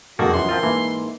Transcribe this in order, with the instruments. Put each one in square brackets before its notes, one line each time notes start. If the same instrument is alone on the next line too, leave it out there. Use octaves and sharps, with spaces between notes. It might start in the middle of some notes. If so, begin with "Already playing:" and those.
[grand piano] E1 F2 G#4 [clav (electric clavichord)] D#3 A#3 A4 [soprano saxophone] F#4
[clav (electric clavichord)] F#2 B3 [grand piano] E3 F3 [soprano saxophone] C6
[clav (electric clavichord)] F3 C4 F4 [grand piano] A#4
[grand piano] G#2 A#3 [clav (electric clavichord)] E3